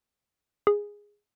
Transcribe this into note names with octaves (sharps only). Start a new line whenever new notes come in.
G#4